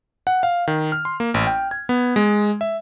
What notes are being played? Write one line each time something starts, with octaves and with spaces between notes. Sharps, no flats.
F#5
F5
D#3
F6
C6
A#3
A1
G5
G#6
B3
G#3
E5